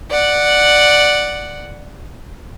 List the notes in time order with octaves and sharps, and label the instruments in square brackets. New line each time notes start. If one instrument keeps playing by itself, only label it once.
[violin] D5 F#5